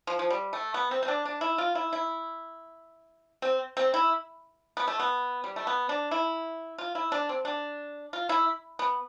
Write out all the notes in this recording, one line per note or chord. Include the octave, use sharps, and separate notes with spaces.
F3
F3
G3
A3
B3
C4
C4
D4
D4
E4
F4
E4
E4
C4
C4
E4
B3
A3
B3
G3
A3
B3
D4
E4
F4
E4
D4
C4
D4
F4
E4
B3